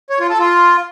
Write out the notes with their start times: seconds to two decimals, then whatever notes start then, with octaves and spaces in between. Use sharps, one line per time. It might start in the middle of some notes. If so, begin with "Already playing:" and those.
0.10 C#5
0.20 F4
0.30 A4
0.40 F4